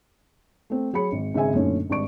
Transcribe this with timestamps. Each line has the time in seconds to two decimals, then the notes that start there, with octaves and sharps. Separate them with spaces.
0.70 A3 C4
0.93 F#3 G#4 C#5 B5 C#7
1.12 G#1
1.34 G#1 G#2 C#3 E5 G#5
1.53 F#2 A#2 D3 A3 C#4 D#4
1.90 G#1 G2 D4 D5 C#6 D7